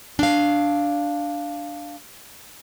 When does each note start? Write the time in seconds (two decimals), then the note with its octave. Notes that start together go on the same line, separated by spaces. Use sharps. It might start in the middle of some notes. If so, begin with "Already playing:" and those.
0.19 D4 F5